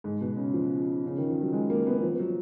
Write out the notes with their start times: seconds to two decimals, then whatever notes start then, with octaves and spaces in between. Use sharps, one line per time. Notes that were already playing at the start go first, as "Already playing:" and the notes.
0.04 G#2
0.21 B2
0.37 C#3
0.54 F3
1.06 C#3
1.18 D#3
1.30 F3
1.42 F#3
1.53 G#3
1.70 A#3
1.86 B3
2.03 F3
2.19 F#3